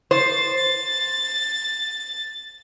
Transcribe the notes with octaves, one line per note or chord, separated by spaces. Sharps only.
C5 A6